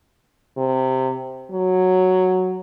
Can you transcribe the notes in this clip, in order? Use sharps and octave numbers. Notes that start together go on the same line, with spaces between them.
C3
F#3